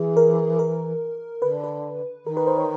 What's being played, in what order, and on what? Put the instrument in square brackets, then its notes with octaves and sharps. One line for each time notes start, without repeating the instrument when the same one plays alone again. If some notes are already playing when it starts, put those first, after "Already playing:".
Already playing: [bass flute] E3 [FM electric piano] G#4
[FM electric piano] A#4
A#4
[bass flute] D3 [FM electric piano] B4
[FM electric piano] B4
[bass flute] D#3 [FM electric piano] A#4
[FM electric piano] B4
C5
C#5